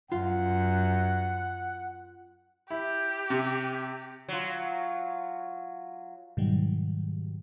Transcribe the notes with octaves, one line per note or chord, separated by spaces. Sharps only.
F#2 F4 F#5
E4 G4
C3
F#3 F4
G#2 B2 D#3 F#3 G3